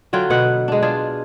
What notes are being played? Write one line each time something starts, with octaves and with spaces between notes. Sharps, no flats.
D3 F#3 F4 G5
B2 B4 F#5
G#3 D4
D4 F4 G#4